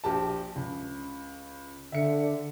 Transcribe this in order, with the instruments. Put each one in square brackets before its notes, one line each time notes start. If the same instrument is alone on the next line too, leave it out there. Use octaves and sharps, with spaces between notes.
[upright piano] A#1 G4 A5
C#2
[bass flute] D3 [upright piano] E5 C#7